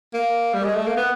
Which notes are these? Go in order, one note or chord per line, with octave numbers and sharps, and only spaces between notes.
A#3
G3
G#3
A3
A#3
B3